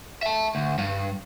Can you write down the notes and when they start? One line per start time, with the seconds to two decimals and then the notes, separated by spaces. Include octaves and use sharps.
0.23 E5 A5
0.55 D2
0.78 G2